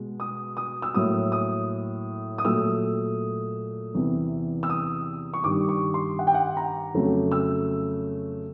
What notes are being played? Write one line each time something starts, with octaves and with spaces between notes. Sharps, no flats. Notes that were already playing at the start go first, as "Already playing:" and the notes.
Already playing: B2 G#3
D#6
D#6
E6
A2 F#3 A#3 D#6
D#6
D#6
A#2 F#3 A3 E6
E2 C3 E3
E6
D#6
C#6
G2 D#3 G3 D6
C#6
C6
F#5
G5
F#5
A#5
F2 C#3 F#3 A3
E6